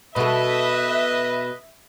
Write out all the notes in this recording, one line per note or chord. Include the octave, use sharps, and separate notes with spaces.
B2 A4 B4 D#5 E5